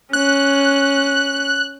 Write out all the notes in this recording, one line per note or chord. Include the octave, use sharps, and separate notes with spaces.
C#4 F#6